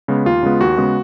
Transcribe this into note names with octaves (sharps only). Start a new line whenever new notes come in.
C#3 G#3 B3
D#2 F4
C#3 G#3 B3
D#2 F#4
C#3 G#3 B3